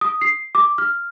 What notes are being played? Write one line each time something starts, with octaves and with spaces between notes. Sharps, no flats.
D#6
C7
D6
F6